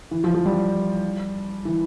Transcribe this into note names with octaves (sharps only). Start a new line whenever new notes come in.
E3
F3
F3
G3
E3